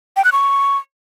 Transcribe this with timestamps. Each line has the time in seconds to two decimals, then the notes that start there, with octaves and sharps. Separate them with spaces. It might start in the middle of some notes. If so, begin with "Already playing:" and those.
0.17 G5
0.24 F#6
0.32 C#6